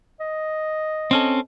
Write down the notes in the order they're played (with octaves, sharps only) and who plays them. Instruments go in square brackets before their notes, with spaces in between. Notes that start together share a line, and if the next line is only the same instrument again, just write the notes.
[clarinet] D#5
[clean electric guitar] C4 C#4 A4